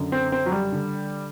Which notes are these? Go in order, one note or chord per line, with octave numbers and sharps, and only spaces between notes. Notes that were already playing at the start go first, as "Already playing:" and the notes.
Already playing: F#2 D3
C4
C4
F#3
G3
D3